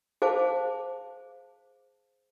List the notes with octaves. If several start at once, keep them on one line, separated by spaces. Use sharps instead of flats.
G#4 C5 F5 A5 D6